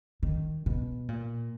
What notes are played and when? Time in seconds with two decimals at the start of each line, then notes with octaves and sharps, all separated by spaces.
0.23 D#3
0.66 B2
1.08 A#2